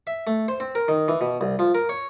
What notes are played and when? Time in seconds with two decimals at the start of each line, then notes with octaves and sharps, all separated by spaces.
0.07 E5
0.27 A3
0.48 C5
0.60 C4
0.75 A#4
0.88 D#3
1.08 E3
1.21 B2
1.41 C2
1.59 F3
1.75 A#4
1.89 C#5